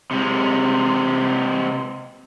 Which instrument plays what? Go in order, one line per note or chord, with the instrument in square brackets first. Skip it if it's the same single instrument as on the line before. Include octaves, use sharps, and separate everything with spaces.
[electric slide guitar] C3 G#3